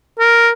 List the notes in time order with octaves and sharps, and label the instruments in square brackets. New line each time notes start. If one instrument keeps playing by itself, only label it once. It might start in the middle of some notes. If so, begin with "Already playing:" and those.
[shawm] A#4